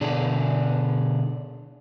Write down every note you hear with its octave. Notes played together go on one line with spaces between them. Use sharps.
B2 D3 D4 G#4